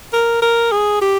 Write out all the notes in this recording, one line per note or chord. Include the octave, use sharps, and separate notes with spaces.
A#4
A#4
G#4
G4